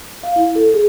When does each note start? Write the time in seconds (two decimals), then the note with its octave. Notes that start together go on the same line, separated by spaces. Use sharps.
0.23 F5
0.36 E4
0.56 A4
0.74 G#4